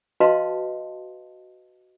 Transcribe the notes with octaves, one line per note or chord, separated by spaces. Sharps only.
F#4 B4 D#5 F5 A5 C6